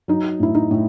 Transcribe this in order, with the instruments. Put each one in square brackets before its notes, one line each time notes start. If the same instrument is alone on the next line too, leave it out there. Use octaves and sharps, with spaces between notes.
[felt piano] F#3 D#4
A2 E4
D#4
A2